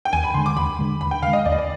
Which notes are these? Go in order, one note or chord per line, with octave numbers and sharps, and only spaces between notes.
G5
D#2 G#5
B5
D3 G#3 C6
D6
D#2 B5
D3 G#3
D#2 B5
G5
D3 G#3 F5
D#5
D#2 D5
D#5
D5